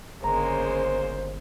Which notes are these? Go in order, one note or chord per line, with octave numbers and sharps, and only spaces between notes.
G1 C#3 G#3 A#3 C5 A#5